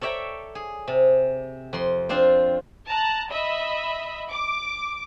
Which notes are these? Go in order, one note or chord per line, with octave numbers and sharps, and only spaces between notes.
A4 C#5 D5 E5 G5 A#5
G#4
C3
F2 C6
C4 D4 F4 C5
A5 A#5 F#6
D#5 E5 B5
D6